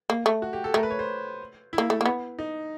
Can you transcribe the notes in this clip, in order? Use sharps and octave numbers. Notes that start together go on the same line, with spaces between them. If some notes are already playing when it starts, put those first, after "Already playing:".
A#3
A3
F#4
G4
A4
A3 A#4
B4
C#5
C5
E4
A#3
A3
A#3
B3
D#4